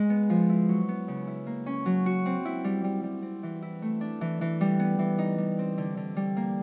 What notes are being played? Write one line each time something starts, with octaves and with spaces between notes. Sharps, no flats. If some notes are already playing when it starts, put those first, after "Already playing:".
Already playing: G#3
B3
F3
E4
F#3
B3
C#3
E4
A#3
C#4
F#3
F#4
C4
E4
G3
G3
G3
C4
E3
E4
A3
D4
E3
E3
G3
B3
E3
D#4
G3
C4
D3
D3
G3
A#3